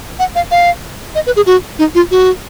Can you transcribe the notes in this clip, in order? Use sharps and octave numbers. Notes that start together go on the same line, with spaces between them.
F#5
F5
F5
D#5
B4
G#4
F#4
D#4
F4
F#4